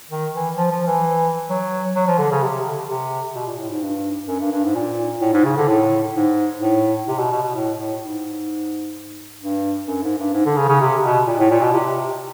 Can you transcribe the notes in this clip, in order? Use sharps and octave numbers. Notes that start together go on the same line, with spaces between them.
D#3
E3
F3
F3
E3
F#3
F#3
F3
D3
C#3
C3
D3
C3
B2
A#2
A2
G#2
G2
F#2
G2
G2
G#2
A#2
A2
G#2
C#3
D3
A2
G#2
A2
C3
B2
B2
B2
A2
A2
G#2
G2
F#2
G#2
G2
G#2
D3
C#3
C#3
C3
B2
A#2
A2
A#2
B2
C3